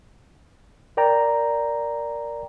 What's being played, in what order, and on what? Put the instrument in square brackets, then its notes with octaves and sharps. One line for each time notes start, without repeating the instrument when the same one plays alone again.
[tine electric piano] A#4 D5 G5 A#5